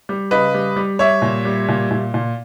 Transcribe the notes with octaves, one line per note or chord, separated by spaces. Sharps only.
G3
C#3 B4 D#5
G3
G3
G3 C#5 E5
A#2
G3
A#2
A#2
A#2